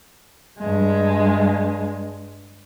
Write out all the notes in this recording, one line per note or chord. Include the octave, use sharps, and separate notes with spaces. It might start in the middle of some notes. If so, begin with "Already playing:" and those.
G2 G#3